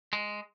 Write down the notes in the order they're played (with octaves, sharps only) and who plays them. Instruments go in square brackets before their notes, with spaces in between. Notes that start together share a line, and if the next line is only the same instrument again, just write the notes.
[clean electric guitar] G#3